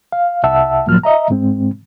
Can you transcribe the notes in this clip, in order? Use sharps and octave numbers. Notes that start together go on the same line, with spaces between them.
F5
C2 E5 F#5 A5 E6
C#2 A2 F3 F#3 A#3 F6
D#5 E5 A#5
G#2 G#3 C4